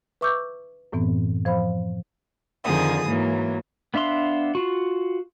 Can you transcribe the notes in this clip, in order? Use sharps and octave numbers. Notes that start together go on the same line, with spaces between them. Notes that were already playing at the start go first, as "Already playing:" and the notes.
B4 E5 C#6 D6 E6 G6
F#2 A2 E3 B3 C4
F3 C5 F5 B5
F2 D3 D#3 F3 G#4 D#6
G#2 E3 F#3 A#3
B3 D4 E5 F5 C6
F4 F#4